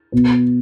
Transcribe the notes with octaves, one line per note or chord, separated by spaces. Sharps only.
B2